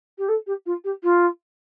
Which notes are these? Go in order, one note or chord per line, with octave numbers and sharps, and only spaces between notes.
G4
A4
G4
F4
G4
F4